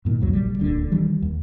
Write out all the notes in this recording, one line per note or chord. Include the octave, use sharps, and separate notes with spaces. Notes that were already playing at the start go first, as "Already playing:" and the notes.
G2 A#2 D#3
C2 F2 F#3
A#1 D3 G3
D#1 D2 A#2 D3
D#3 E3 G3
D#2